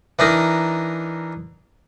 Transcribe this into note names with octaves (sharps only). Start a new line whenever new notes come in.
E3 D4 D#4 A#4